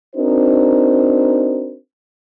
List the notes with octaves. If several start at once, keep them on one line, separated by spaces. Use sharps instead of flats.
C4 D4 D#4 F#4 A#4 C5